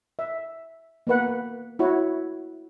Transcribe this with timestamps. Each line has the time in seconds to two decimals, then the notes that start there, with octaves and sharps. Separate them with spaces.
0.19 E5
1.07 A#3 B3 B4 F#5
1.79 E4 F#4 C#5